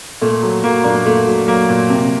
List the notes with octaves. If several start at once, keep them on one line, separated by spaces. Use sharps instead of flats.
A#2 A3
F#3
F#3 A#3
A#2 A#3 D4
A#3
A#2 A3
F#3
F#3 A#3
A#2
C3